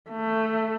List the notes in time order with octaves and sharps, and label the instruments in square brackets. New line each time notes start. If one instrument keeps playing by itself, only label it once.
[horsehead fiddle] A3